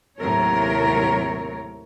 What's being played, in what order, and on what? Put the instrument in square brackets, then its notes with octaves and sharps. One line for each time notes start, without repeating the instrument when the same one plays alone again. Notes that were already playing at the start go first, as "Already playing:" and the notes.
[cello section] D#2 A2 C3 F#3 A#4 C#5